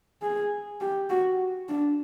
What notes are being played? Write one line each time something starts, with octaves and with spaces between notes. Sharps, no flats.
G#4
G4
F#4
D4